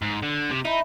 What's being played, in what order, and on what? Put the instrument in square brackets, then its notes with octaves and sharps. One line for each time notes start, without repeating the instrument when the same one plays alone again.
[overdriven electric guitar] G#2
D3
C3
[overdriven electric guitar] D#4 [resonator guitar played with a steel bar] E4